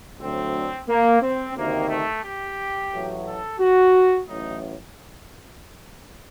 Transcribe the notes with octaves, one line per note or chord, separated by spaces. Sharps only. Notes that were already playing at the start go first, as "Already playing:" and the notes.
D2 D3 F#3 C4
A#3
C4
D2 C3 D#3 A#3
A3
G4
A1 A2 F#3
A4
F#4
A1 A2 F#3 D#4